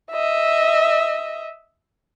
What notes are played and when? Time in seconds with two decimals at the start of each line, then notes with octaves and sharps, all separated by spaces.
0.11 D#5 E5